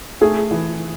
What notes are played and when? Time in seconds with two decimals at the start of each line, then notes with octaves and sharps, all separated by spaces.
0.21 A3 G#4
0.51 E3